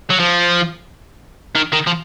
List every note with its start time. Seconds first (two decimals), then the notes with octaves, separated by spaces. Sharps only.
0.10 F#3
0.20 F3
1.55 D#3
1.73 D#3
1.87 F3